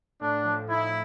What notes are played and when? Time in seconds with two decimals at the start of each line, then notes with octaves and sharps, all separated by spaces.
0.21 A2 D4
0.45 F3
0.69 D#4 E4